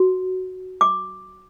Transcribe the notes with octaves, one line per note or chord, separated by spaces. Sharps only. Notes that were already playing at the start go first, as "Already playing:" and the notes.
Already playing: F#4
D6